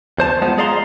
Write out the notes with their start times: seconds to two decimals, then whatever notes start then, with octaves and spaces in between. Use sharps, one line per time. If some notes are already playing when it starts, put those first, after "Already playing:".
0.18 E2 C5 A5
0.42 G#3 B3 F4
0.58 G#3 G#4 D5 F5 A#5 C6